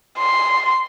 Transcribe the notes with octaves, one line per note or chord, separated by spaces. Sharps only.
C6